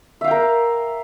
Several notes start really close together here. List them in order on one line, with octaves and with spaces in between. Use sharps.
E5 F5 G5 A#4